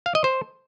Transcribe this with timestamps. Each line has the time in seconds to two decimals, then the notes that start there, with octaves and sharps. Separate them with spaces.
0.06 F5
0.15 D#5
0.24 C5